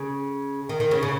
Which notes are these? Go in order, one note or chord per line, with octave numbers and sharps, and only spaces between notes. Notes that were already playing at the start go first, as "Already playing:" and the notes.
Already playing: C#3
D#3
D#3
C#3
C#3